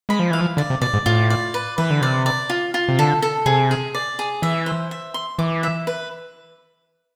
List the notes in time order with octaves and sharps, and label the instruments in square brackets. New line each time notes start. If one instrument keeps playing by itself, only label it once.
[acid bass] G#3 [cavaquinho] B5
[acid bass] F3
[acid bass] E3 [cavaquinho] F5
[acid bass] F3
[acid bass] D3 [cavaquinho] D5
[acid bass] C3
[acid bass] B2 [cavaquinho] D5
[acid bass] G#2
[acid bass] A2 [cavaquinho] F4
[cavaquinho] D5
B4
[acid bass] E3 [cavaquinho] B4
[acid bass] D3
[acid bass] C3 [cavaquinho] D5
[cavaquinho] D5
F4
F4
[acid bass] C3
[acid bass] D3 [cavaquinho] A4
[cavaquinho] A4
[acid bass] C3 [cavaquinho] G#4
[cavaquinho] G#4
D5
G#4
[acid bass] E3 [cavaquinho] E5
[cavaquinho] C5
E5
C6
[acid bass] E3 [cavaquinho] D6
[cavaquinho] E5
B4